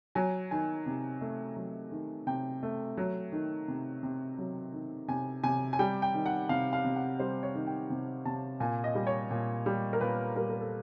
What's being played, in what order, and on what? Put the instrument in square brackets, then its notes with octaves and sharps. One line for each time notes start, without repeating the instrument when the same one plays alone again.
[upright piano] F#3 G#5
D#3 G#5
C3
A3
F#3
D#3
C3 G5
A3
F#3
D#3
C3
C3
F#3
D#3
C3 G#5
C3 G#5
G#5
G3 G5
G5
D#3
F#5
C3 F5
F5
C3
F#5
G3 C5
C#5
D#3
G5
C3
C3 A5
A#2 G#5
D#5
G3
C#5
A#2
G3
A#4
A#2 B4
G3 A#4
A#4
A4